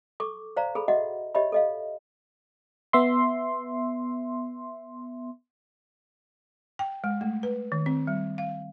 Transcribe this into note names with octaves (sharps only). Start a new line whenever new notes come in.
A4 C#6 D6
C5 D5 F5 A#5
G#4 A4 B5
F#4 D#5 E5 F#5
G4 C#5 D#5 E5 B5
A4 D#5 F5
B3 E5 C6
G5
G#3
A3
B4
D#3
C4
G3
F5